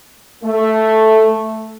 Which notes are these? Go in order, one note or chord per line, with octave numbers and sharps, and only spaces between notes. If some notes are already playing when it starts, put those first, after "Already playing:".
A3